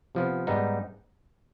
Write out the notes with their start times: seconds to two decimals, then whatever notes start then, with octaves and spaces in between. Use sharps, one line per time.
0.15 C3 F3 B3
0.47 G#2 G3 B3 D#4